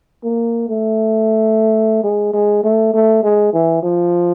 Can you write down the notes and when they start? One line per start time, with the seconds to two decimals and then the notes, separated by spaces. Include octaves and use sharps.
0.24 A#3
0.69 A3
2.04 G#3
2.34 G#3
2.64 A3
2.94 A3
3.23 G#3
3.53 E3
3.83 F3